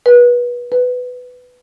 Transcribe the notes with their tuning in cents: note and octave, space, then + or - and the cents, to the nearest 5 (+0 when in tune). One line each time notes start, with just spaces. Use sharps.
B4 -25
B4 +10